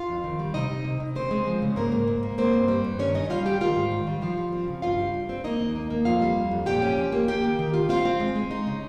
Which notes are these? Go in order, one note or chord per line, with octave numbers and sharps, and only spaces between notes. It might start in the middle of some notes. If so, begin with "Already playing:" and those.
Already playing: F4 F5
F2
D#3
G3
C3 D#4 D#5
C3
C3
C3
C#3 C4 C5
G#3
F3
C#3
G#2 A#3 A#4
G#2
G#2
A#3
A#3 C4 C5
G2
G3
G2
D#3 C#4 C#5
C#4 D#4 D#5
G3 F4 F5
F4 G4 G5
D#3 F4 F5
G#2
D#3
G3
F3 F4 F5
F3
C4
C#3
G2 F4 F5
G3
G2
C4
A#3 D#4 D#5
D#2
A#3
A#3
F2 F4 F5
G3
F2
F2
A#2 G4 G5
C#4
F3
A#3
A#3 G4 G5
D#3
D#3
F4
C4 F4 F5
C4
G#3
G#3
D#4
C#3